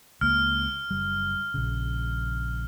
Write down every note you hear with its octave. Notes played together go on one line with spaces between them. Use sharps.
C#2 A#3 F6
F#1 G3
A#1 C#3